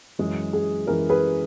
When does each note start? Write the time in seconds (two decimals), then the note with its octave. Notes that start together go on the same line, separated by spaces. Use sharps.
0.19 F#2 E3 G#3
0.53 G#4
0.87 F#2 E3 G#3 A#4
1.09 G#4 B4